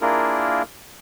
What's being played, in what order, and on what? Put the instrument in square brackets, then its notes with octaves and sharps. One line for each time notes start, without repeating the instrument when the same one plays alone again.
[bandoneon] A#3 D4 E4 F4 G#4 A#4